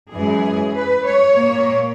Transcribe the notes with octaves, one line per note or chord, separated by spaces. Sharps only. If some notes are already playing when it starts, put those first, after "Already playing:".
F#2 E3 G#3 G#4
B4
C#5
A#2 A#3